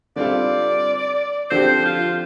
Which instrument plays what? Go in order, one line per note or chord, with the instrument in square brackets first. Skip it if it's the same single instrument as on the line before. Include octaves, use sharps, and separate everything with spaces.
[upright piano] D3 G3 C4 F4 A4 [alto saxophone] D5
[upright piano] D3 F3 C4 G4 [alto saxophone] C5
[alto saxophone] F4